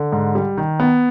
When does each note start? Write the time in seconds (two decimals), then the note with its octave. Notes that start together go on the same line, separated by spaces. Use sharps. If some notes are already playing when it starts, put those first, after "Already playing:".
Already playing: D3
0.12 G#2
0.35 G3
0.57 D#3
0.80 B3